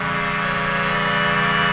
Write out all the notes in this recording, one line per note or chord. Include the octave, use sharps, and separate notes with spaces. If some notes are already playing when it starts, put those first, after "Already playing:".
Already playing: F2 C#3 E3 G3
G#4
C#5
D5
D5